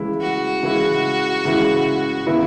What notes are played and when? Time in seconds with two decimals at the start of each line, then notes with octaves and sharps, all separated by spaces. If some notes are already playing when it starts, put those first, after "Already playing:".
Already playing: C#3 E3 G#3 E4
0.22 F#4
0.63 C#3 E3 G#3 E4
1.45 C#3 E3 G#3 E4
2.27 C#3 E3 B3 E4